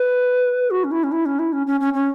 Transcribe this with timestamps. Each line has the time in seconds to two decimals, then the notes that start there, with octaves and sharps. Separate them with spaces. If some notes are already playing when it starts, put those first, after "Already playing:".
Already playing: B4
0.71 F#4
0.84 C#4
0.91 E4
1.04 C#4
1.12 E4
1.26 C#4
1.39 E4
1.53 C#4
1.67 C#4
1.80 C#4
1.94 C#4